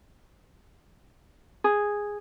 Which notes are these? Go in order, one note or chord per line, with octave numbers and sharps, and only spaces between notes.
G#4